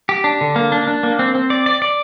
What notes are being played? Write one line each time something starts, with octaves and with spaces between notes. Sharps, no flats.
G4
D4
D3
A#3
D4
D4
A#3
C4
C4
D5
D5
D5